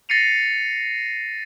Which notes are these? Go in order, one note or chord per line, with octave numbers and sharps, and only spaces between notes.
A6 A#6 C7 C#7 D#7 F7